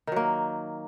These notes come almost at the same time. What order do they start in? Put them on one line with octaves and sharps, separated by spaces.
D#3 F#3 A#3